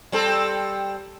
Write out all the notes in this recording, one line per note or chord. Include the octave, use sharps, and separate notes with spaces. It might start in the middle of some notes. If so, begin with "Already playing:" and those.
G3 C4 A4